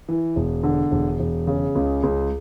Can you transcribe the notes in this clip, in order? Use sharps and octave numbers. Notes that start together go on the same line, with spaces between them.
E3
E1
D3
E1
E1
C#3
C#2
C#2